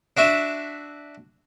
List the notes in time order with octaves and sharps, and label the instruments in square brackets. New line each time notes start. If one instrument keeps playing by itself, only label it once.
[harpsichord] D4 F#4 E5